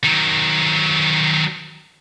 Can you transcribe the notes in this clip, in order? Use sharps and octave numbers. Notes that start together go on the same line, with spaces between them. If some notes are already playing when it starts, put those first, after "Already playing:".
D#3 F#3